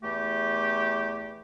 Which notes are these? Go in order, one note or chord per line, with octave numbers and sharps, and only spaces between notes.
E2 A3 G4